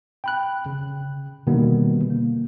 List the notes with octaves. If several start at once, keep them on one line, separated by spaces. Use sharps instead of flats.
G5 B5 F#6
C#3
B2 D3 D#3 G3 A#3 B3
A#3